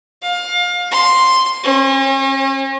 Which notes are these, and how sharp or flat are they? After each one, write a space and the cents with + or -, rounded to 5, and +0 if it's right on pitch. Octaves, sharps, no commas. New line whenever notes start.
F5 +25
C6 +0
C#4 -40